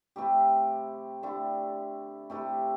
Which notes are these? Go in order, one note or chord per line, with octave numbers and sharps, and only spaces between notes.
C3 A3 E4 G4
D3 A3 E4 G4
C3 A3 E4 G4